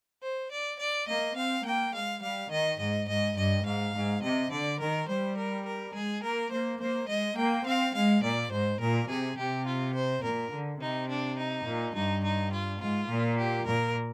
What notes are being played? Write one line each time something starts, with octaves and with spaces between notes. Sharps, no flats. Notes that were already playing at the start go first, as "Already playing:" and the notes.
C5
D5
D5
A#3 D#5
C4 F5
A#3 G5
G#3 F5
G3 F5
D#3 D#5
G#2 D#5
G#2 D#5
G2 D#5
G#2 F5
G#2
C3 D#5
D3 D5
D#3 A#4
G3 C5
A#4
A#4
G#3 G#4
A#3 A#4
A#3 C5
A#3 C5
G#3 D#5
A#3 G5
C4 F5
G#3 F5
A#2 D5
G#2 C5
A#2 A#4
C3 G#4
C3 G4
F4
C5
A#2 A#4
D3
C3 D#4
D4
D#4
A#2
G2 D#4
D#4
F4
G#2 F4
A#2
G4
A#2 A#4